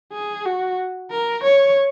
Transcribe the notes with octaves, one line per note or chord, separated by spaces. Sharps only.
G#4
F#4
A#4
C#5